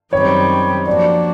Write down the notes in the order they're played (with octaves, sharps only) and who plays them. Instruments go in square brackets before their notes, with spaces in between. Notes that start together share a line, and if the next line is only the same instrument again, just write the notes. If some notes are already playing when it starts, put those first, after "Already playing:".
[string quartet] F#2 D#3 G3 C4 [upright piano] C#5
[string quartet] F3 A#3 D4 F#4 [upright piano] D5